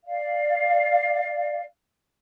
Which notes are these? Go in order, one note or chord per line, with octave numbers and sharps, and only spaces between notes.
D5 F5